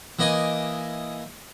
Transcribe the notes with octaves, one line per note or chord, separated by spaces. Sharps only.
E3 A#3 D#5 G#5 D6